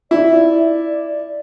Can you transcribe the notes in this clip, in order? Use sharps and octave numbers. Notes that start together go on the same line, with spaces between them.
E4 D5